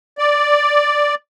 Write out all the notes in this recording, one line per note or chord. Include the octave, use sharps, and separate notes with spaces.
D5